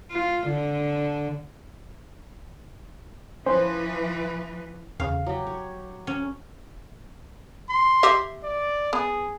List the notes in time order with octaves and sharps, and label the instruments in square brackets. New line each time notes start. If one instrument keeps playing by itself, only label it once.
[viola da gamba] F4
D3
[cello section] E3 F3 B4 [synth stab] C#4 C5
[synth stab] E2 C#3 [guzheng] F5
[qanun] F#3 G4
C#5
[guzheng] C#4
[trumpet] C6
[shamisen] G4 D#5 E5
[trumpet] D5
[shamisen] B3 [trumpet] G#4